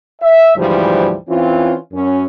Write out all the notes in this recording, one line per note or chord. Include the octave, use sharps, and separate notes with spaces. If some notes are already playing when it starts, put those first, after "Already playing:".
E5
D2 G#2 E3 F3 G3
E3 C4 C#4 F4
F#2 C#4